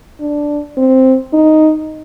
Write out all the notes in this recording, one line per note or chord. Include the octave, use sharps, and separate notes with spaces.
D4
C4
D#4